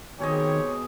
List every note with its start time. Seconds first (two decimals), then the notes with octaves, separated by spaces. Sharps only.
0.20 B2 D#3 C4 G4 G#4 C#5 D#5